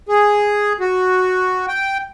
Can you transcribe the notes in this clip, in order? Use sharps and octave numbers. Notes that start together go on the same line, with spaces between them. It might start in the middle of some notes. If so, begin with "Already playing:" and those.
G#4
F#4
G5